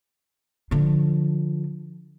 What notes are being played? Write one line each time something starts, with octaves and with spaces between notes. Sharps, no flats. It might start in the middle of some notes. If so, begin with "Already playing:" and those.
D3 F3